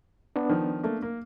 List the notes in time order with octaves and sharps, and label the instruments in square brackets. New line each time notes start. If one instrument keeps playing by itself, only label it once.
[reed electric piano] B3 D4
[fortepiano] D#3 F3
A3 A#3
A#3